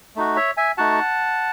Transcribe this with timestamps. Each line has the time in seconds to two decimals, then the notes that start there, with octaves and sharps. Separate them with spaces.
0.16 A3 D#4 F#4
0.36 C#5 E5
0.57 E5 G#5
0.77 A3 D#4 F#4 F#5 A5